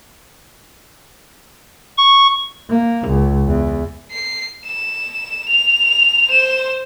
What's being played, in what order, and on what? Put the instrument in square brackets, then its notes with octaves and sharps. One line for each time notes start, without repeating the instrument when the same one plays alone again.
[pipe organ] C#6
[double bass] A#3
C#2
E2
[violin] C7
E7
F7
C5 E7